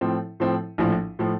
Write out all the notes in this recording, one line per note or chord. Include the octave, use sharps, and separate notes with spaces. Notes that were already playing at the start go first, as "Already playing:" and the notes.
A2 F3 C4
A2 F3 C4
A#1 A2 F3
A2 F3